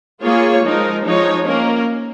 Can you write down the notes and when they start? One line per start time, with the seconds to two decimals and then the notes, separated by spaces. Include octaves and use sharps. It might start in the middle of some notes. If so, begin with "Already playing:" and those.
0.22 A#3 F4 G#4 C#5
0.63 F3 G#3 D#4 A#4
1.05 F3 G#3 D#4 C#5
1.46 A#3 C#4 A#4